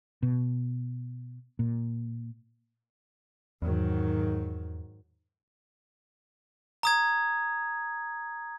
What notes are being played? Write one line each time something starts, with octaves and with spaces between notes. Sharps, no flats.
B2
A#2
E2 G#2 D#3 F#3
A#5 D#6 G#6